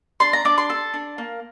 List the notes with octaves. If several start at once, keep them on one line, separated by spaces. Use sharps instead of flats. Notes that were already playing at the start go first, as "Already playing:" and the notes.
D4 C6
A#5
D4 D6
C6
A4
D4
A#3